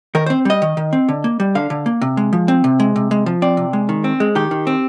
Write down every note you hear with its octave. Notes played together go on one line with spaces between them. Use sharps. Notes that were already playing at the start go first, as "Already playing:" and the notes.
D#3 A#4
C4 C5
G3 D#5
D#3
D#3
C4
D3
A#3
G3
D3 F5
D3
A#3
C3
G#3
F3
C4
C3
G#3
C3
G#3
F3
C4 D5
C3
G#3
D#3
C4
G#3
D#3 G4
D#3
C4